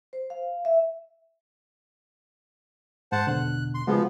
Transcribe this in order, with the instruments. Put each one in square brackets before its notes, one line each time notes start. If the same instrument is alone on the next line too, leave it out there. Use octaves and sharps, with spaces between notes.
[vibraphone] C5
F5
E5
[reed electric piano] G#2 [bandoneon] C5 F#5 A5
[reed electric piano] E2 B2 D3 [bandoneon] F#6
[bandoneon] C6
[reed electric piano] C#3 G#3 F#4 [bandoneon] F3 B3